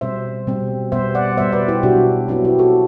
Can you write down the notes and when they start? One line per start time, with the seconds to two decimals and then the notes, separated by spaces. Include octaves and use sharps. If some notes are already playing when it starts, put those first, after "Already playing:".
0.01 B2 G3 C4 C5 E5
0.47 B2 G3 C4
0.92 B2 G3 B3 C5 E5
1.15 D5 F#5
1.37 B2 G3 B3 C5 E5
1.53 B4 D5
1.68 E4 G4
1.83 B2 F#3 B3 D4 F#4
2.28 B2 F#3 B3 C4 E4
2.44 E4 G4
2.59 F#4 A4